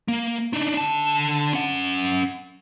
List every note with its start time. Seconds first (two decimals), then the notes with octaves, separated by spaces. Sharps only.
0.08 A#3
0.53 D4 D#4
0.77 D3 A5
1.53 C#4 F#5